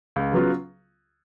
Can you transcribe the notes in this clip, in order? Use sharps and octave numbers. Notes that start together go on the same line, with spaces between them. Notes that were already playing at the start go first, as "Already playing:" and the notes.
C#2
C#3 F#3 B3 F4